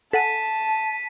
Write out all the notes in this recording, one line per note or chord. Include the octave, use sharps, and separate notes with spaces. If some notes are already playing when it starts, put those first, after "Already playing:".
A4 F#5 G#5 A5 B6 D#7